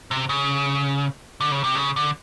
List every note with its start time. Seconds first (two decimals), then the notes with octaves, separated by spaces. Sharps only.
0.11 C3
0.29 C#3
1.41 D3
1.52 C#3
1.64 C3
1.75 C#3
1.96 D3